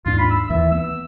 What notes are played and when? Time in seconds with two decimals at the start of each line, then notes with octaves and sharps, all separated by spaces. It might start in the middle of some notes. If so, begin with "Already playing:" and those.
0.06 D#2 G#2 D4 F4
0.19 B5
0.31 E6
0.50 D#2 E3 E5
0.72 A#3 B3 E6